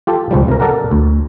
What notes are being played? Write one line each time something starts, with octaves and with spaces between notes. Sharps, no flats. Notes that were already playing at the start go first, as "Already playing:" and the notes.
F4 G4 A4
C#2 F3 G3
C3 A#4
A4 A#4 D5 F#5 A#5
D2